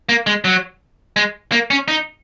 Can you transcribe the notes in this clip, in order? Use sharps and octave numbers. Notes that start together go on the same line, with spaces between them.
A#3
G#3
F#3
G#3
A#3
C#4
D#4